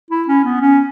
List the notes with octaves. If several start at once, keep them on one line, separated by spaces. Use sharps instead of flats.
E4
C#4
B3
C#4